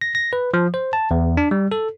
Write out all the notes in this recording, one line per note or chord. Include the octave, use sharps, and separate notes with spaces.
A#6
A#6
B4
F3
C5
A5
E2
D4
G3
A4